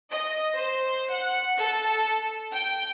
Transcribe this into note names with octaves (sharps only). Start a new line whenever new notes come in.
D#5
C5
F#5
A4
G5